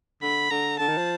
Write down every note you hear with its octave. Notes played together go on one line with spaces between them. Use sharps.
D3 B5
D3 A#5
D3 A5
D#3
F3